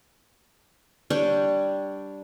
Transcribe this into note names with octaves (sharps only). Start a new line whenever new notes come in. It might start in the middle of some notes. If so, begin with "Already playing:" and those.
G3 D4 C#5 G5